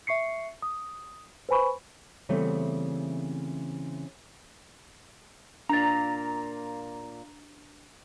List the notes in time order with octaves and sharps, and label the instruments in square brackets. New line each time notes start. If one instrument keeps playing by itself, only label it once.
[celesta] E5 C#6 C7 C#7
D#6
B4 C5 G#5 B5 C#6
[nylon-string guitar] C#3 E3 G3 A3 B3 C4
[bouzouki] A#2 A#3 [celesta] D4 A6 [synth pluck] A#5